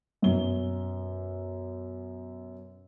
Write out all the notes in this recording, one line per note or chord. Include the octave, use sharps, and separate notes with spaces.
F#2 B2 G7